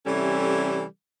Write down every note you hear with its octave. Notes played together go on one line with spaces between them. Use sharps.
C3 E3 G3 A3 C#4 A4